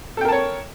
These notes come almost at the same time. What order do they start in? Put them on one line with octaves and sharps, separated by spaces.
A4 G5 A#4 A5 C#5